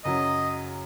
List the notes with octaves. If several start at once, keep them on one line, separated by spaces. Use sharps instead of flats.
F#2 C#3 F#3 D#5